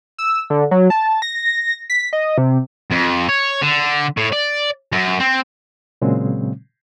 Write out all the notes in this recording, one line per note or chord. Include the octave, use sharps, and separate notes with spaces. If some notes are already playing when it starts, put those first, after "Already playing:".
E6
D3
F#3
A5
A#6
B6
D#5
C3
F2
C#5
D3
A2
D5
F#2
C4
A#2 C#3 F#3 G#3 C4